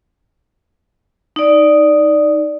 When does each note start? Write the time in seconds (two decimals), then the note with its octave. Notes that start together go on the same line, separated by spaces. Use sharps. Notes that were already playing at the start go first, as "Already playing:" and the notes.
1.36 D#4 D5